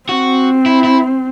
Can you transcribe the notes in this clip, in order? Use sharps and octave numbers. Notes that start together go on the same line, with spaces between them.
C4 F#4
E4
E4